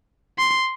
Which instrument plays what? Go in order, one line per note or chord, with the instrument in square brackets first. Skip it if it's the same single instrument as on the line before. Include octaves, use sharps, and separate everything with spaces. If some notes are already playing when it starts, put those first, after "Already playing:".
[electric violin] C6